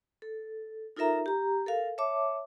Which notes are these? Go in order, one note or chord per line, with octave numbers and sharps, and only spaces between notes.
A4
D#4 F4 A4 A#4 E5 A#5
G4 A#5
A4 A#4 F5
C#5 E5 A5 D6